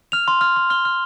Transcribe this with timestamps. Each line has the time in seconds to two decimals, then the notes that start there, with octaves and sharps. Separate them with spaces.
0.12 F6 F7
0.28 C6
0.41 F6
0.56 C6
0.70 F6 G7
0.85 F6